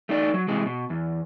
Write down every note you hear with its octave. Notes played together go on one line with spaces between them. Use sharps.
A3 D#4 D5
F#3
C3 E3 G#3
B2
E2